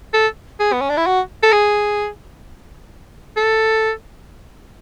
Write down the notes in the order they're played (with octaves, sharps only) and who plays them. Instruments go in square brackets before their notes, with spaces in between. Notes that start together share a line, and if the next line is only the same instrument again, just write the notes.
[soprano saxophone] A4
G#4
B3
C#4
D4
E4
F#4
A4
G#4
A4